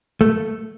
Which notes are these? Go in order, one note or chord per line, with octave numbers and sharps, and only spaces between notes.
A3